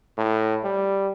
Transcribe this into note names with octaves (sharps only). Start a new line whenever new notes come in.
A2
G3